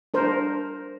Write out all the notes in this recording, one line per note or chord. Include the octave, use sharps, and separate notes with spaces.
D4 A#4 C5